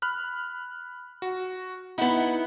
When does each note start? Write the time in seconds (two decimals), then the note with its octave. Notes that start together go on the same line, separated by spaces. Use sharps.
0.02 B5 F6 F#6
1.22 F#4
1.98 B3 D#4 E4 F#5